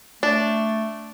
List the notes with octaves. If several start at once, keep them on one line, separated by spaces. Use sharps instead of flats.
A3 D4